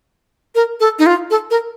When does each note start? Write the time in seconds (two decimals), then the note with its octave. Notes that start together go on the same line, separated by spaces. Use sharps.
0.55 A#4
0.80 A4
0.99 D#4
1.06 F4
1.30 A4
1.51 A#4